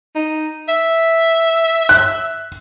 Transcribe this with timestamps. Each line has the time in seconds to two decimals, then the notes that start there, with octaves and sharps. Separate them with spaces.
0.15 D#4
0.69 E5
1.89 F#6